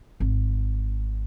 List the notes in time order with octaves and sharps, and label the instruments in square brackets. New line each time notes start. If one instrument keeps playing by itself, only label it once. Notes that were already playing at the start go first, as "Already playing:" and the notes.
[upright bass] G#1